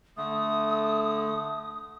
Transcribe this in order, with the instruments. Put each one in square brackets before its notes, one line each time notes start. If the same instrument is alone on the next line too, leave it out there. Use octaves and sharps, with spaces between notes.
[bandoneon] D3 A3 [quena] D#6